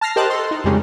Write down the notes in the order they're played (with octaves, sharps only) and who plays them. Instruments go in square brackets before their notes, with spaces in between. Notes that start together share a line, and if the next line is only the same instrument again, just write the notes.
[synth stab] A5 F6 A#6 C7
G4 A#4 C5 D#5 A5 F#6
A4 C6
D#4
F2 C#3 G3 G#3 C#4 D#4